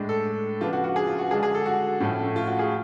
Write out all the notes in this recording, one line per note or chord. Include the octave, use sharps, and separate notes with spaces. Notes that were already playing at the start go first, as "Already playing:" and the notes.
Already playing: A2 G#3 D4
A4
C#3 F3 B3 D4 F4
F#4
F#4
G#4
F4
F#4
D3 G#3 D4 G#4
G#4
A4
F#4
A2 F3 A3 C#4
F4
F#4
G#4